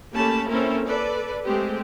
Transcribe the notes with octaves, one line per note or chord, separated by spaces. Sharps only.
A3 A#3 C#4 G4 A5 B5
A#3 C4 C#4 E4 A4 A#4
A4 B4 D5
G#3 A3 C4 G4